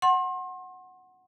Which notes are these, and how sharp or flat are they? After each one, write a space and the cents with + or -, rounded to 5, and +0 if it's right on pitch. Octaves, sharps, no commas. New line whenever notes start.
F#5 +0 C6 +35